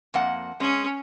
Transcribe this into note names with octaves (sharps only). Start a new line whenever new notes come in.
F2 A#3 F#5
G#3 C#4 G#4